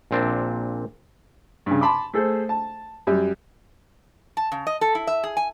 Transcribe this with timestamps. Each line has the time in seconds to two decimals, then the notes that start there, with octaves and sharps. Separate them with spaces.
0.11 A#1 A#2 C4 D4
1.66 G2 C#3
1.81 A5 B5 C6 D6
2.14 A3 G#4 A4 C5
2.49 A5
3.07 F#2 G3
4.37 A5
4.52 C#3
4.67 D#5
4.81 A4
4.95 E4
5.07 E5
5.24 G#4
5.37 G#5